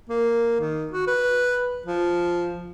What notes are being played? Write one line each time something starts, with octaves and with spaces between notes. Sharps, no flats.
A#3
D#3
F#4
B4
F3